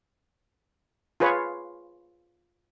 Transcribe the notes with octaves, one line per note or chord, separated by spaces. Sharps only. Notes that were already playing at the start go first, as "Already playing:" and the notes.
F4 G#4 B4 C#5